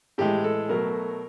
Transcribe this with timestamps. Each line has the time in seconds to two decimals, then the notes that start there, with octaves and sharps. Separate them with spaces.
0.18 A2 E3 G#3 G4
0.44 A4
0.69 B2 F#3 A3 A#4